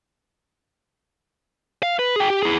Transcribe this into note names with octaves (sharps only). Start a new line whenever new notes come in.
F5
B4
G#4 G5
G4
E4 G#4